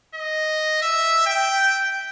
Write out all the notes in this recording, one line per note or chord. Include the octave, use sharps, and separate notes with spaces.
D#5
E5
G5